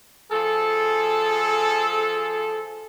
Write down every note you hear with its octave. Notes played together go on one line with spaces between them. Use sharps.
F3 G#4 A4